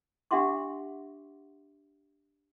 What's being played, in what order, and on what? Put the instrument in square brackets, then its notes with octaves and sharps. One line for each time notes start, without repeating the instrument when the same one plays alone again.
[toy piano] D4 G4 E5 F#5 C6 D6